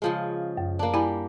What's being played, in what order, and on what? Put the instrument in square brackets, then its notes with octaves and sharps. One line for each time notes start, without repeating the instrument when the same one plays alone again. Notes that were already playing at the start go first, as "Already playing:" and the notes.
[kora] C#3 F3 G#3
[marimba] F#2
[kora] A#3 D4
[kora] G3 [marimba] E4 G#5 B5